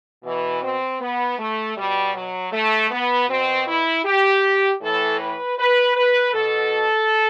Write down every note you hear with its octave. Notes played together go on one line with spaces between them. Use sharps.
B2 E3
C4
B3
A3
B2 G3
F#3
A3
B3
B2 C4
E4
G4
A2 E3 A4
B4
B4
B4
B2 A4